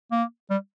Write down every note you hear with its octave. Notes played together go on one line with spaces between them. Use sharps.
A#3
G3